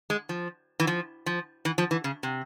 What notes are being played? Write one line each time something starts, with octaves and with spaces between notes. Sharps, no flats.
G#3
F3
E3
F3
F3
E3
F3
E3
C#3
C3